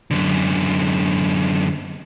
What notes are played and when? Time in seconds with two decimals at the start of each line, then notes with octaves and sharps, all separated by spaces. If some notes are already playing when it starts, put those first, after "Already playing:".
0.11 F#2 D3